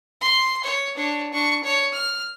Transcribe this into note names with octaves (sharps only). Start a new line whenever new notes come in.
C6
C#5
D4 C#5
D4 C#6
C#5
F6